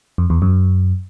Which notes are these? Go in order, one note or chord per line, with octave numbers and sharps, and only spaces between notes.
F2
E2
F#2